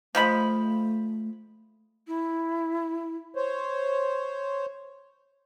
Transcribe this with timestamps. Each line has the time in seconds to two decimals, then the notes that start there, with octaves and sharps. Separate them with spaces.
0.15 F3 G#3 A3 B5
2.07 E4
3.35 C5 C#5